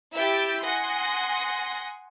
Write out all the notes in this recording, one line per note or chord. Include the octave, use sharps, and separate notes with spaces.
E4 G4 E6 G6 A6 D7
F#5 G#5 C6 D#6 A#6